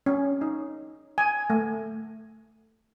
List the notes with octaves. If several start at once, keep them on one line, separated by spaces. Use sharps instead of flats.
C#4
D#4
G#5
A3